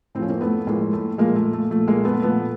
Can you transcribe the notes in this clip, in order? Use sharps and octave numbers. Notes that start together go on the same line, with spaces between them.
A2 F3 C4 C#4
A#3 C4
A3 B3
A2 F3 G#3 A#3
A3
A#2 F3 G#3 A#3
A3
A3
A#2 F3 A3
G#3 A#3
A3 B3
A#2 F3 A3 B3